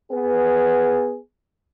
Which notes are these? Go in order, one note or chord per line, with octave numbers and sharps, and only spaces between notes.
B3 G#4